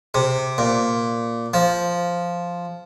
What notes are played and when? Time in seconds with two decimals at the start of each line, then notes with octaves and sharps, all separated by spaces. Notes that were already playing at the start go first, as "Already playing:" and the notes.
0.14 C3
0.58 A#2
1.54 F3